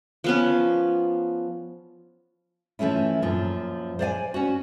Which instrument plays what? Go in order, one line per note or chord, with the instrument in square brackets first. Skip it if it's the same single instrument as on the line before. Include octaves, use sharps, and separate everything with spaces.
[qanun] F3 B3 C#4
[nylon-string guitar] E3 F3 A3 C#4 E4
F#2 A#2 F3
C5 D5 F5 G#5
C#4 F#4